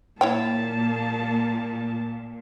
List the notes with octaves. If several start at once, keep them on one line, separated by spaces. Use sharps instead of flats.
A#2 A#3 E4 C#5 G5 A5